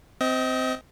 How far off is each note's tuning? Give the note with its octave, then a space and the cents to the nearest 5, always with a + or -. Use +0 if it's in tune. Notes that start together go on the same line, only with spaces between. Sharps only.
C4 -15 D#5 +25